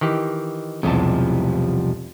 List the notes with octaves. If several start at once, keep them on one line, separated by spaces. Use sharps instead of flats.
D#3 E3 G4
B1 E2 C3 F3 G3 A5